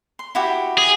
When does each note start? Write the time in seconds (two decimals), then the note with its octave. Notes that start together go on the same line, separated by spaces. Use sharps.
0.19 C6
0.35 E4 F#4 G4
0.78 G#4